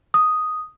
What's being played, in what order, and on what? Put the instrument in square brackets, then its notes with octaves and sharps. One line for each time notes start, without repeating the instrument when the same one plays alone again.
[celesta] D#6